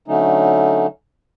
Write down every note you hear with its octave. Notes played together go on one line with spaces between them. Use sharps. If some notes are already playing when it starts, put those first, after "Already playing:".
D3 F#3 A3 C#4 D#4